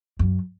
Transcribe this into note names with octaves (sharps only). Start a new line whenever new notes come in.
F#2